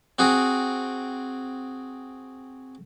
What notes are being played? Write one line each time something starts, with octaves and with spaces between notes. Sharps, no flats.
C4 F#4 G#4